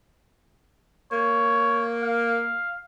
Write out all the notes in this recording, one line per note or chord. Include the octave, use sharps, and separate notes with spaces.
A#3 C#5
F5